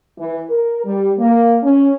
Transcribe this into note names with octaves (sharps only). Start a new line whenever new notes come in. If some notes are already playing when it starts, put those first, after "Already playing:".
E3
A#4
G3
A#3
C#4